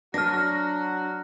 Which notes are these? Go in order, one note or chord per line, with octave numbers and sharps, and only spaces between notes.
F#3 D4 F#4 F6 A#6